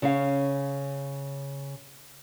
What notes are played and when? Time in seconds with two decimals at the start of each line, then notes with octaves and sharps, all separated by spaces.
0.02 C#3 C#4 F5